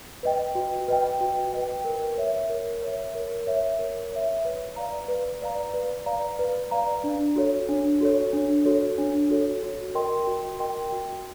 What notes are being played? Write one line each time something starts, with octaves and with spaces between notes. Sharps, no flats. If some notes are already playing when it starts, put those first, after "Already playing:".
B4 D#5 G5
F#4
B4 D#5 G5
F#4
B4 D#5 G5
A#4
C#5 E5
A#4
C#5 E5
A#4
C#5 E5
A#4
C#5 E5
B4
D5 F5 A#5
B4
D5 F5 A#5
B4
D5 F5 A#5
B4
D5 F5 A#5
D4
F#4 A4 C#5
D4
F#4 A4 C#5
D4
F#4 A4 C#5
D4
F#4 A4 C#5
F#4
A#4 D#5 G5 C6
F#4
A#4 D#5 G5 C6
F#4